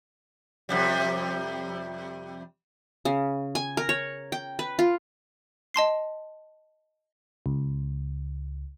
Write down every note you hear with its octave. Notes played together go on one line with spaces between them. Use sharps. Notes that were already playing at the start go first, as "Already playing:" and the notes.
F2 C3 G3
C#3
G#5
A#4
C#5
G5
B4
F4
D#5 A5 C6 C7
C#2